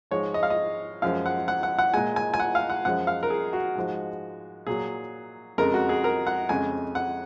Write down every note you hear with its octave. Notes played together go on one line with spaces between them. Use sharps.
G#2 F3 G#3 C#5
D#5
F5
D#5
F#2 F3 G#3 F5
F#5
F#5
F#5
F#5
A#2 G#3 G#5
G#5
G#5
F#5
F5
F#5
F#2 F3 G#3 F#5
F5
A#4
G#4
F#4
G#2 F3 G#3
A#2 F#3 G#4
F2 C#3 G#3 A#4
F#4
G#4
A#4
F#5
F2 C#3 G#3 G#5
F#5